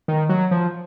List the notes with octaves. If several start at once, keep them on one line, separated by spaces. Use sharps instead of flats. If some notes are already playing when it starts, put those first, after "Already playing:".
D#3
F#3
F3